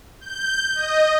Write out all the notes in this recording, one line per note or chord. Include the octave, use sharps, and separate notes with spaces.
G6
D#5